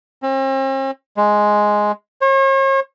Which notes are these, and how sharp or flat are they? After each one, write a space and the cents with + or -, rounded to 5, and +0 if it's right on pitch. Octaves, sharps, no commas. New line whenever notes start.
C4 +45
G#3 +5
C#5 -40